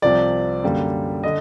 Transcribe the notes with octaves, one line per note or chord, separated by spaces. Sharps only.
C2 C3 F3 D5
F#2 D3 G3 A#3
D3 D#5